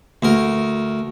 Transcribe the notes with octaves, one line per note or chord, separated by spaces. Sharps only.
D2 A#4